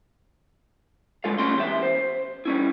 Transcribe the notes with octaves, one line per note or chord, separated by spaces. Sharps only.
D3 G#3 F4 A4 F5
G3 A3 C#4 F4 C6
E2 G4 E5
C5
G3 C#4 E4